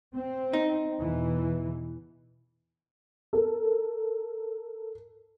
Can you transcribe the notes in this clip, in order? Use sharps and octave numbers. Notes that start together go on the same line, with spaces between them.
C4
D#4
E2 B2 E3
A4 A#4